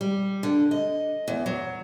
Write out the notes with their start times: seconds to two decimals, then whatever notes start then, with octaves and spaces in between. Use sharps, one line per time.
0.01 G3
0.43 D3
0.71 D#5
1.28 E2
1.46 F#3